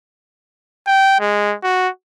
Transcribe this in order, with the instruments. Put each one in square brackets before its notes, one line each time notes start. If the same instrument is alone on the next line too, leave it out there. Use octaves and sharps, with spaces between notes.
[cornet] G5
G#3
F#4